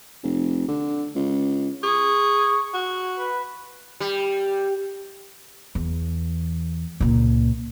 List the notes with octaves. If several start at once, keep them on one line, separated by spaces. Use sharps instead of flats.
F1
D3
C#2
G#4 C#6
F#4
B4
G3
E2
C#2 A#2